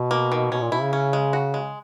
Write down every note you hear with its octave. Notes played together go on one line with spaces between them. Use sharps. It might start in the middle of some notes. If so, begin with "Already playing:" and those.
Already playing: B2
A#3
D#3
B2 C#4
A#2
B2 E4
C#3
C#4
G#3
F#4
G#3